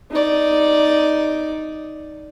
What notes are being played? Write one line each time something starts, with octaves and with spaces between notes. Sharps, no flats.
D#4 D5